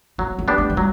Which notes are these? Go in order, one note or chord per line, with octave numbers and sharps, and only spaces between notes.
F#3 B3
A3
B3 D4 G4
A3
A3
F#3 G3